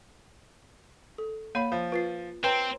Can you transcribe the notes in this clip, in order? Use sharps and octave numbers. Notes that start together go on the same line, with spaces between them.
A4
A#3 C#5 F5 B5 D#7
F3
F4 B4 A6 C7
C4 B4 C#5 G5 A#5